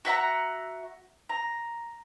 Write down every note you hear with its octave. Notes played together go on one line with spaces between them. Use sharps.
F#4 E5 F#5 A#5
A#5